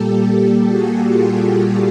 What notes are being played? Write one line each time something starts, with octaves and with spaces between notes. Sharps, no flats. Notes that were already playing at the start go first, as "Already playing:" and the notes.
Already playing: A#2 G3 A#3 G4 A4
F#4 G#4
F4 G4
G4 A4